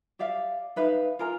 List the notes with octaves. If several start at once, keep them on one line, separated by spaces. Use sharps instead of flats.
G4 D5 E5 F5
D#4 B4 E5 F5
F4 A#4 G#5 A#5